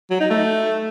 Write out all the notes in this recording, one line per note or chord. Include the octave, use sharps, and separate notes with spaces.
F#3
D#4
A3